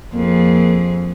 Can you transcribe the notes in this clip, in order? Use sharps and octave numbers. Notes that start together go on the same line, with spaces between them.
F2 A#3 G#4